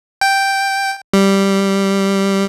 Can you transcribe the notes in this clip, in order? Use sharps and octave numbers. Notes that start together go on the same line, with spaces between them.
G5
G3